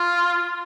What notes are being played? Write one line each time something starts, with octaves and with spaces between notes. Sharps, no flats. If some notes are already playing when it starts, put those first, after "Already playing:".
Already playing: F4